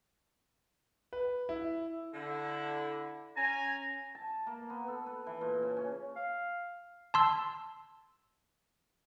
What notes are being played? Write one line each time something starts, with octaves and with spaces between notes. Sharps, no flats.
B4
E4
D3 E4
C#4 G#5 A#5
A5
A#3
B3
A4
B4
E3
A#2
C#3
C#4
F5
A5 C6 E6